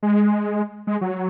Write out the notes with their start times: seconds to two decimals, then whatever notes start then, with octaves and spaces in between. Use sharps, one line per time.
0.03 G#3
0.87 G#3
1.01 F#3